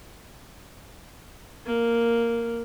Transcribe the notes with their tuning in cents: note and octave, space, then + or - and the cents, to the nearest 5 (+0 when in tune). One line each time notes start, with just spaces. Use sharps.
A#3 -5